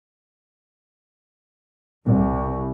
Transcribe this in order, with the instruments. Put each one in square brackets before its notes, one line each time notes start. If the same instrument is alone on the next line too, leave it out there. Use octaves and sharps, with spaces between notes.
[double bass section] C2